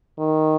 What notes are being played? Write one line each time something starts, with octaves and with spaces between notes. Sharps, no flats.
D#3